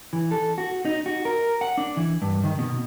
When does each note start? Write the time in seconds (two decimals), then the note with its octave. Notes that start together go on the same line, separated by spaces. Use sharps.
0.13 E3
0.31 A4
0.58 F#4
0.85 D#4
1.06 F#4
1.25 A#4
1.61 F#5
1.78 D4
1.97 E3
2.22 G2
2.44 D#3
2.59 B2